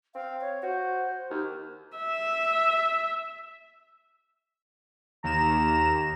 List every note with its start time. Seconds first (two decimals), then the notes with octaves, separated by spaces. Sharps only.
0.15 C4 F5
0.41 C#5
0.63 F#4 C5
1.30 D#2
1.97 E5
5.24 D#2 A#5 E7